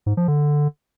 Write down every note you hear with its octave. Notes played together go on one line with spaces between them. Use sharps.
G#2
F3
D3